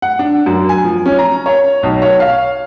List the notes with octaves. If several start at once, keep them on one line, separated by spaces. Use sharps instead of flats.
F#5
D4
F#2
G#5
F3
C#4
A#5
C#5
B1
C#5
F5